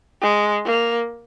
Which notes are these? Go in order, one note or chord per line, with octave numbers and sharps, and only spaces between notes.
G#3
A#3